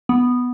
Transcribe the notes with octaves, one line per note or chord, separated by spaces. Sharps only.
B3